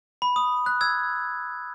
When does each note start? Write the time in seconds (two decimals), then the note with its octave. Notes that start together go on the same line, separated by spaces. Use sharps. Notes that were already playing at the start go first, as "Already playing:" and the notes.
0.22 B5
0.36 D#6
0.66 F#6
0.81 E6 G#6